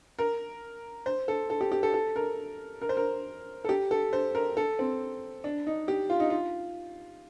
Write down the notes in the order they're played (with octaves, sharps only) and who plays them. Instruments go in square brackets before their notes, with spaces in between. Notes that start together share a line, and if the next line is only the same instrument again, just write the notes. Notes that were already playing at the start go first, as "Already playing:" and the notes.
[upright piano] A#4
C5
A4
A4
G4
G4
A4
A4
A#4
A#4
C5
A#4
A4
G4
A4
C5
A#4
A4
C4
D4
D#4
G4
F4
D#4
F4